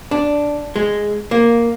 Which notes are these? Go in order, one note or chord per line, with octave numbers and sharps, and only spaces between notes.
D4
G#3
A#3